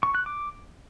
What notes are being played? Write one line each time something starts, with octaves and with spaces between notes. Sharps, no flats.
C#6
F#6
D6